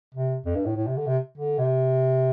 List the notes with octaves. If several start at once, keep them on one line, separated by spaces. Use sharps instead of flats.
C3
F2
G2
A2
A2
C3
D3
C3
D3
C3